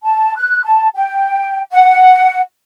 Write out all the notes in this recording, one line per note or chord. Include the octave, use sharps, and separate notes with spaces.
A5
F#6
A5
G5
F#5